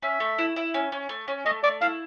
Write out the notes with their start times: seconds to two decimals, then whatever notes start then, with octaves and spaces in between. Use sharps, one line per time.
0.03 C#4 E5
0.20 A3
0.38 E4
0.56 E4
0.74 C#4
0.92 C#4
1.09 A3
1.28 C#4
1.46 A3 D#5
1.63 A3 D5
1.81 E4 F5